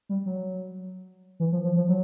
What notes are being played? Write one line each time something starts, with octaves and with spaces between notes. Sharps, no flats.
G3
F#3
E3
F3
F3
F3
F#3